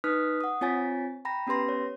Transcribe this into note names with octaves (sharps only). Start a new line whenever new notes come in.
D#4 B4 D#6 F6 F#6 B6
F#5 D#6
C4 F4 C#5 G#5 A6 B6
G5 A#5 B5 A#6
B3 C#4 G4 B4 C6 A#6
C#5